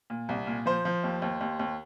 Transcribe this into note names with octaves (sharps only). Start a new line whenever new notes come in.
A#2
C2
A#2
F3 C5
F3
D#2
D#2
D#2
D#2